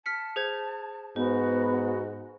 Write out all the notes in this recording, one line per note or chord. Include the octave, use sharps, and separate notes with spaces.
A5 F6 B6 C#7
G#4 C5 G#6
G#2 B3 F#4 C5